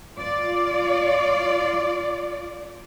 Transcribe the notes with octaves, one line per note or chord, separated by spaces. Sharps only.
F4 D5